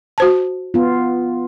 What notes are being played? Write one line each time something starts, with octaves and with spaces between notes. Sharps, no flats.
F#4 C5 A5
B3 F4